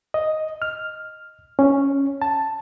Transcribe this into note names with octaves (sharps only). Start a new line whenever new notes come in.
D#5
F6
C#4
A5